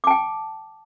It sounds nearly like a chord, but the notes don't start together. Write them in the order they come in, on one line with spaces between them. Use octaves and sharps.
D6 A5 G5